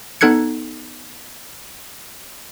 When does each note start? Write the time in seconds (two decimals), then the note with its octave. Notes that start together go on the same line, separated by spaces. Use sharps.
0.21 B3 D#4 A4 F#6 G#6 C#7